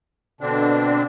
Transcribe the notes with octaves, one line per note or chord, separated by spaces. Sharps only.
B2 D3 C4 D4